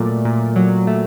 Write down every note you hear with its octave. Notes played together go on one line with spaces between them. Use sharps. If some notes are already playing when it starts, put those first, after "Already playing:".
Already playing: A#2 F#3 A3 D5
A#2
F#3
A3